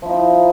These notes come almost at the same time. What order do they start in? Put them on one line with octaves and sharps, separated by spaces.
F3 E4 D#4